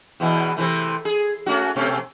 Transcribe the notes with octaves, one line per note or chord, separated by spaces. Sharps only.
E2 B2 E3
C3 E3 A3
G#4
A3 C#4 F#4
B2 A3 C#4